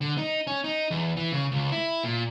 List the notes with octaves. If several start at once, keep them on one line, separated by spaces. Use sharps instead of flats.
D3
D#4
C#4
D#4
E2
E3
C#3
C#2
E4
A#2